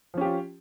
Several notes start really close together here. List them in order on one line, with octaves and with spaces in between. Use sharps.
F3 C#4 G4 F4